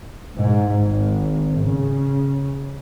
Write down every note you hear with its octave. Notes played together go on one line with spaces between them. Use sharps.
G#2
G#1
C#3